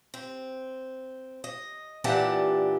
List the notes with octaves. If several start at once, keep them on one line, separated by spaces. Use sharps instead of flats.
C4
D#5
A#2 E3 D4 G4 F#5 A5